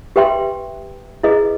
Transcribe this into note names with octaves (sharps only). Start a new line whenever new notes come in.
G4 B4 E5 G5 C6
E4 G#4 B4 D#5